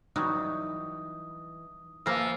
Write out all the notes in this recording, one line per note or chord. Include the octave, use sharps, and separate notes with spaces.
E3 F#3 G3 D#4 D#6
E3 F3 A#3 E6 A#6 C7